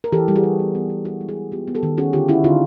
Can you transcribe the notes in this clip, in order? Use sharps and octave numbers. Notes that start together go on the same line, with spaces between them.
A#4
E3 G4 A4
G3
F#4 G#4
G3
B3
B3
B3
B3 E4 F#4
G#3
F#4 G#4
G#3
B3 F4 G4
B3
G4 A4
D#3
C#4 F#4 G#4
D3 F4 G4
C#4 E4 F#4
D3 D#4 F4